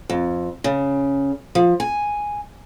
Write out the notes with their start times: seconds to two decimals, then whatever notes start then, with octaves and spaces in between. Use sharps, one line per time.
0.10 F2
0.64 C#3
1.55 F3
1.80 G#5